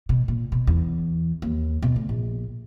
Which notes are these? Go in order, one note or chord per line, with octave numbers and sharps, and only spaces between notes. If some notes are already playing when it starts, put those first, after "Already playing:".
B2
A#2
B2
E2
D#2
B2
D2
A#1